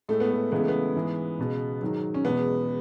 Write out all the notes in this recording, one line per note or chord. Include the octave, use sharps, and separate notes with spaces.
A2 G#3 A3
B3
A3
C#2 C#3 E3 G#3 B3
A3
B3
G#2 E3 G#3
C#2 B2 G#3
G#2 D#3 F#3
C#4
E2 B2 G#3 B3